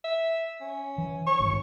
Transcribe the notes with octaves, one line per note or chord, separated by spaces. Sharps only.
E5
C#4
E3
C#6
G#1 G2